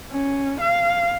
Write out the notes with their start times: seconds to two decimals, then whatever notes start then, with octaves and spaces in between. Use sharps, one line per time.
0.11 C#4
0.61 F5